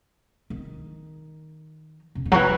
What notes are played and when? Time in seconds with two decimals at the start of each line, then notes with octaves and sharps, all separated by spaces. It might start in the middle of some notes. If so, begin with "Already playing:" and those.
0.50 D#3
2.15 C#3
2.25 D#3
2.32 F#3
2.35 E3